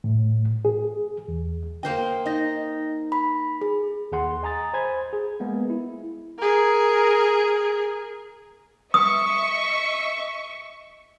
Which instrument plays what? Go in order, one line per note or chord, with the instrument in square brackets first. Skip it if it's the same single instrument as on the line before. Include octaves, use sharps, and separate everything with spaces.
[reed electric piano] A2
G#4
E2
[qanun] A#3 C5 D#5 [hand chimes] G5
[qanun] D#4 [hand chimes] D#5 A#6
[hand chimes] B5
G#4
[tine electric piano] D#2 G#4 F#5 C6
D#5 G#5 A#5 D#6 A6
C5 G#5 B5 G#6
G#4
G#3 A#3 B3
E4
[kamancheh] G#4 A#4
[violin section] D#5 E5 C#6 [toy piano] D#6